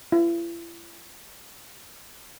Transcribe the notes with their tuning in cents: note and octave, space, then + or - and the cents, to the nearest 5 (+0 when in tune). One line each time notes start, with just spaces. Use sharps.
E4 +45